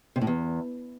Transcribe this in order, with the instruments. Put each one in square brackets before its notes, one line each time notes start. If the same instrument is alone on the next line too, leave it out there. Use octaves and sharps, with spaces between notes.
[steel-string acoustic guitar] C3
A2
E2